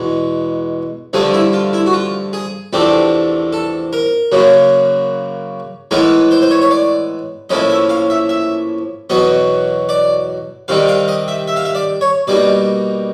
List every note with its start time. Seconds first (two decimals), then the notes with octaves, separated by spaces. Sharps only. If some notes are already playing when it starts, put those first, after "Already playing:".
Already playing: E2 B2 G#3 B3
1.13 G2 D3 F3 A3 G#4
1.34 E4
1.53 F4
1.73 E4
1.86 F#4
1.93 F4
2.33 G#4
2.73 E2 C3 F3 A3 D4 G4
3.53 A4
3.93 A#4
4.32 F#2 C#3 F#3 A#3
5.91 A2 E3 G#3 B3 D#4 A#4
6.31 C5
6.42 C5
6.51 C#5
6.62 C#5
6.71 D5
7.50 A2 F3 A#3 C#4 E4 D#5
7.70 E5
7.89 F5
8.10 E5
8.29 E5
9.10 E2 B2 F#3 B3 D#5
9.89 D5
10.68 C3 D#3 G3 F5
10.88 F5
11.08 D#5
11.28 E5
11.48 E5
11.56 F5
11.65 E5
11.75 D5
12.01 C#5
12.27 B2 G3 A#3 D#4 D5